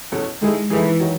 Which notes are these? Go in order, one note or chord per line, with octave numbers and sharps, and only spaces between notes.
E2 B2 A3 C#4
D#3 G#3 A3 E4 G#4
D#3 E3 A3 E4 G#4
D#3 F#3